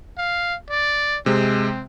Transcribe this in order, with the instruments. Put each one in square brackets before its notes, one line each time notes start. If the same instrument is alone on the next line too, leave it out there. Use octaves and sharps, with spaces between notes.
[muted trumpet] F5
D5
[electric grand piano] C3 G#3 [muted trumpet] C4